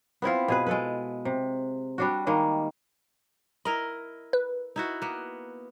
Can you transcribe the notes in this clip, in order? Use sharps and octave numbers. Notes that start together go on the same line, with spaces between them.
B3 C4 E4 F4
B2 G#4 B4
G#3 A4 B4
C3
G3 D4 F#4
D#3 G3 G#3 A#3
E4 A#4 D#5 A#5
B4
D#4 E4 F#4
A#3 B3